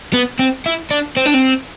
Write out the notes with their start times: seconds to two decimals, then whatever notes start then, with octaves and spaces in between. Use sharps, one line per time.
0.13 B3
0.39 C4
0.66 E4
0.91 D4
1.17 C4
1.26 D4
1.34 C4